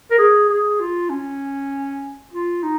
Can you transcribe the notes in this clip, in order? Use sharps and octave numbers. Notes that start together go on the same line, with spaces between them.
A#4
G#4
G#4
F4
C#4
F4
D#4